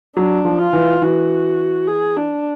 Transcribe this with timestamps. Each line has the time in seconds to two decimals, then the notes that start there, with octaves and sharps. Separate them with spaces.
0.17 F#3 D4
0.45 F3
0.59 F4
0.73 E3
1.02 E3 F#4
1.87 G#4
2.16 D4